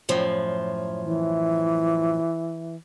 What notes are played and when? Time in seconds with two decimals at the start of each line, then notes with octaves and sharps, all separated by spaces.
0.09 F#2 A2 F3
1.04 E3